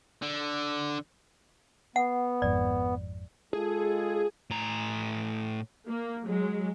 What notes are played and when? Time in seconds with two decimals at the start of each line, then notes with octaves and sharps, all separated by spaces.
0.22 D3
1.96 B3 F#5
2.42 G#1 F2 G#2 D5
3.53 G#3 F4 G#4 A4
4.51 A2 A#5
5.89 A#3
6.25 F#3 G#3